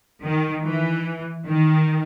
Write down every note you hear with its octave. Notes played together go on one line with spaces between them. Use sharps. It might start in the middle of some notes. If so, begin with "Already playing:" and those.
D#3
E3
D#3